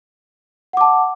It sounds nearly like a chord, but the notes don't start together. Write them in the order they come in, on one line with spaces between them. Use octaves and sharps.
F#5 D6 A5